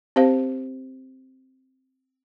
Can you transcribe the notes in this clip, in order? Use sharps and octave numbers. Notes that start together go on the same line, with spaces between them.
C4 G4 C5 F5